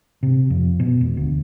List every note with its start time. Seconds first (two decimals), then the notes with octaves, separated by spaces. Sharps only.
0.23 C3
0.50 F2
0.80 B2
1.01 E1
1.17 D2